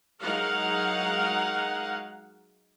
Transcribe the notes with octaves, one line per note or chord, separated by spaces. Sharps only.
F#3 G#3 D#4 A#4 F5 F#5